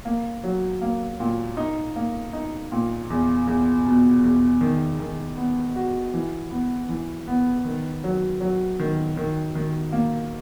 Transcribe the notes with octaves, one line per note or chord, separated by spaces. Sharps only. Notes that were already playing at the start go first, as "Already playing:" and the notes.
A#3
F#3
A#3
A#2
D#4
A#3
D#4
A#2
E2
E2
B2
E2
D#3
D#3
B3
F#4
E3
B3
E3
B3
D#3
F#3
F#3
D#3
D#3
D#3
A#3